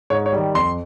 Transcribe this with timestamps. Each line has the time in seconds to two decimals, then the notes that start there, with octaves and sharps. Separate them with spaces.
0.10 G#2 C#5
0.26 C#5
0.33 D#3 G3
0.55 F2 C6